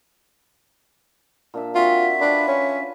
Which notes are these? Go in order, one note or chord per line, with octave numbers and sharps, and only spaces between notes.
A#2 D4 E5
C4 F4 F#4 E5
D4 F4 B4
C#4